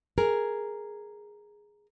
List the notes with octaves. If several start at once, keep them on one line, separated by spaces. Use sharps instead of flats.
G#4 A#4